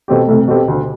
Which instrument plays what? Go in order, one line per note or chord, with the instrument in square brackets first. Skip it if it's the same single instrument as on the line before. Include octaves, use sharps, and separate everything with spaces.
[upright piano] B2 A3 C4 G4
[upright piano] C2 [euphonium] A3
[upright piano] B2 A3 C4 G4
D2